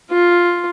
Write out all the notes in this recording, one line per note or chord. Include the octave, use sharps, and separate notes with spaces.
F4